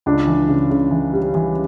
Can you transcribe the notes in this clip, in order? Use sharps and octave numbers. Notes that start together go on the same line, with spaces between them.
C#2 D4
E3
C#3
C#3
E3
G3
E3